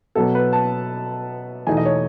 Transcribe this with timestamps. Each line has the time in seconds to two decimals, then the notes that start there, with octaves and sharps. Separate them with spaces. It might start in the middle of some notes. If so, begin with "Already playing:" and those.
0.15 B2 F#3 B3 A4
0.35 B4
0.53 A5
1.67 E2 B2 A3 D#4 G#5
1.77 D#5
1.85 C#5